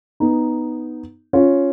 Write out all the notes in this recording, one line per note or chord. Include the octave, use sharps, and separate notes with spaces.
B3 D#4
C#4 F4